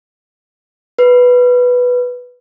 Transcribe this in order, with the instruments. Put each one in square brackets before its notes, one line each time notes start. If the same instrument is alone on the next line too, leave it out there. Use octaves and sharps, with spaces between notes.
[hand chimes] B4